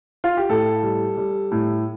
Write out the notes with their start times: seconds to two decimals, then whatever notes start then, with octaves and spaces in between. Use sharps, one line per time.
0.24 F4
0.37 G4
0.49 A2 A4
0.83 G3
1.17 G3
1.52 A2